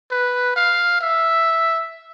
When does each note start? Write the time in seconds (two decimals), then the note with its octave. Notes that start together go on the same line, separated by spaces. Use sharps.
0.11 B4
0.56 F5
1.01 E5